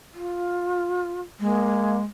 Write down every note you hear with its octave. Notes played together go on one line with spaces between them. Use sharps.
F4
G#3 A#3